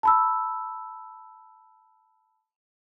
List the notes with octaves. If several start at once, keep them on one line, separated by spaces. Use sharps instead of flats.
A5 B5 E6